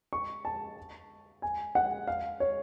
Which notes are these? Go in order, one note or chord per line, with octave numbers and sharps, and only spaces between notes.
C#6
A5
G#5
F#5
F5
C#5